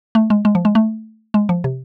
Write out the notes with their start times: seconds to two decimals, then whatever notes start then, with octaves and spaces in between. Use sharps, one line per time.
0.15 A3
0.30 G#3
0.45 G#3
0.55 F3
0.65 G#3
0.75 A3
1.34 G#3
1.49 F3
1.64 C3